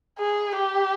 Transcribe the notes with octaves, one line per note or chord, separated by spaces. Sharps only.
G#4
G4